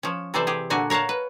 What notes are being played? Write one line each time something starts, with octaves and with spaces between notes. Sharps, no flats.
F3 C#4
C3 E3 A4 C5 D5 E5
G4 G#4
A#2 D3 F#4 G#5 A5
A#4 C#5 F5 F#5 A5
B4